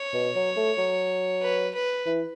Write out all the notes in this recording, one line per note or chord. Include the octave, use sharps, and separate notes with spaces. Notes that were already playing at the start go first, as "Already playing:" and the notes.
Already playing: C#5
B2
F#3
A3
F#3
B4
B4
E3